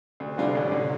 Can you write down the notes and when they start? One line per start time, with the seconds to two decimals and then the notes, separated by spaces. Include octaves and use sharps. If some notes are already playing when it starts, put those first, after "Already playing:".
0.20 D2 C3
0.38 D3 G3 D4 F4
0.55 A1
0.72 D3